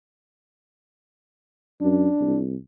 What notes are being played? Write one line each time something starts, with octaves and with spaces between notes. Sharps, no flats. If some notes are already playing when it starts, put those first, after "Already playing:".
F#2 D4
C2